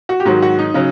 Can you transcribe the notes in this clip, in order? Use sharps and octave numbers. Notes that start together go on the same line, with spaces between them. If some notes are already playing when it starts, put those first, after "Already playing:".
F#4
G4
G#2 D#3 F#3 F#4
F#4
D#4
C#3 F#3